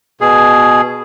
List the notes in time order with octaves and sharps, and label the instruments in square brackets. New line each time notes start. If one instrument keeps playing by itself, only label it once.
[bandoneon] B2 G#4